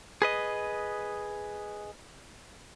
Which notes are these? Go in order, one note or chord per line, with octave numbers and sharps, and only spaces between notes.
G#4 B4 D#5